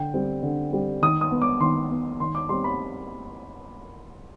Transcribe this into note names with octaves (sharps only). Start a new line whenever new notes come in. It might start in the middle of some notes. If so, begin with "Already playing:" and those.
Already playing: D3 G5
G3 C4
D3
G3 C4
D#3 D#6
D#6
B3
D6
D#3 C6
B3
D#3 C6
D6
G3 C4 C6
B5